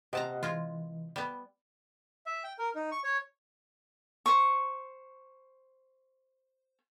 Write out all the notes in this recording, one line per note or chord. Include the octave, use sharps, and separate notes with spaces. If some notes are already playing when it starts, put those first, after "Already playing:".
C3 G4 D#5 F#5 A5 A#5
E3 G#3 F4
G3 B3
E5
G5
A#4
D#4
C#6
C#5
C5 C#6